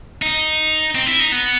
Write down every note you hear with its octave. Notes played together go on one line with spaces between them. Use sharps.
D#4
C4
E4
D#4
B3